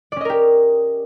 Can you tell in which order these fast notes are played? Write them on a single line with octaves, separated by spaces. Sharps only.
D5 C#4 D#5 A#4 G4